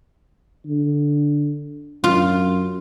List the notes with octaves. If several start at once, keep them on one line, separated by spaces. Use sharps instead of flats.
D3
F#2 F4